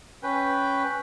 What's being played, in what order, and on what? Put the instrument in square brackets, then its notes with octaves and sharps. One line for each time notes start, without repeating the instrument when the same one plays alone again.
[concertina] C#4 B4 G5